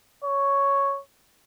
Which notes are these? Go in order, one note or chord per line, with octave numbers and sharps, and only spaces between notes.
C#5